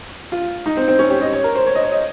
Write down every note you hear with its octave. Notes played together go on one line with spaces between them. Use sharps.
F4
D#4
C4
C4
C#4
G4
D#5
C#5
A#4
C5
C#5
D#5
C#5
D#5